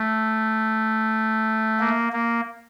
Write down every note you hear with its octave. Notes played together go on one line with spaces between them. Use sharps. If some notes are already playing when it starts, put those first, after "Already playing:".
Already playing: A3
A#3
A#3